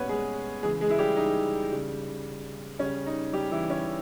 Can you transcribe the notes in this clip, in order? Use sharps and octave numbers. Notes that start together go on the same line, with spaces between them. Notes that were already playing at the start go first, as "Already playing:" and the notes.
Already playing: A#2 G3 B3 C#4 B4 C#5
G#3 G#4
C#3 E3 G#3 G#4
G#3 G#4
E4
G3 G4
D#4
C#3 G3
C#3 G3 C#4
D#4
G3 G4
E3 E4
C#4